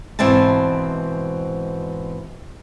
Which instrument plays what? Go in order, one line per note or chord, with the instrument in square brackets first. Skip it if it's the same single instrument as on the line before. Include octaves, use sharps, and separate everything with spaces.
[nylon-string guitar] G#2 B2 E3 C4 E5 A5